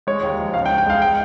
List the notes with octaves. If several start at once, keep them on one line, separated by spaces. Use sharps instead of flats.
G#3 C#5
D#2
F3
C#2 F5
G5
C#2
G5
G#3 F5
G5